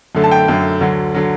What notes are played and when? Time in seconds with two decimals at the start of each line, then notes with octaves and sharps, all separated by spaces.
0.15 F#2 D3 A3
0.24 A5
0.32 G5
0.48 F#2 D3 A3
0.81 D2 D3 F#3
1.15 D3 F#3